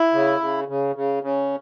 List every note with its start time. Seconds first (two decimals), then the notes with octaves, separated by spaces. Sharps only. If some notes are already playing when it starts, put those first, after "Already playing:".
Already playing: E4
0.13 C#3
0.40 C#3
0.68 C#3
0.95 C#3
1.23 C#3